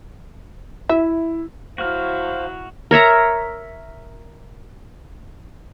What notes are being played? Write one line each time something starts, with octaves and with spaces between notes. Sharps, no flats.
E4 E5
F#3 E4 F#4 C5 F5 F6
A#4 C#5 E5 A#5